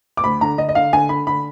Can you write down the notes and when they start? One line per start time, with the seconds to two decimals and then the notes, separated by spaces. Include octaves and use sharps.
0.17 D6
0.24 D2 B5
0.41 D3 A#5
0.58 D3 D#5
0.69 D#5
0.75 D3 F5
0.93 D3 G#5
1.09 D3 B5
1.27 D3 B5